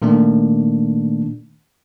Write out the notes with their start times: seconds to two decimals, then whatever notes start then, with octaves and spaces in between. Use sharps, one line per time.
0.02 A#2 D#3 A3 A#3 D4